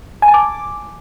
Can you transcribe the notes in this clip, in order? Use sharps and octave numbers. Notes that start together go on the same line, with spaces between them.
G#5
A5
D6